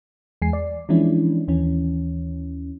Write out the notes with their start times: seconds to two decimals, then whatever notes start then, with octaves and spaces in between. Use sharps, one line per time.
0.42 E2 G#3 G#5 C7
0.53 D5
0.89 E3 F3 G#3 C#4 D4 E4
1.48 D#2 E3 C#4